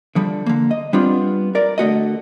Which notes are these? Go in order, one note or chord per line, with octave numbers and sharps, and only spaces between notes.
D3 F3 G3
D3 A#3
D#5
G3 B3 C4 D4 F4
A#4 D5
D3 A3 F#4 D#5